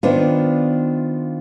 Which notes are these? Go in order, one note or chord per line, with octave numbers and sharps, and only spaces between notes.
D#3 B3 D4 F4 C5